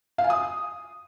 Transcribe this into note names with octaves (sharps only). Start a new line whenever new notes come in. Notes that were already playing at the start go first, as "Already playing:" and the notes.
F5
G#5
D#6